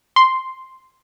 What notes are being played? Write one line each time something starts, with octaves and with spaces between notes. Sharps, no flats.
C6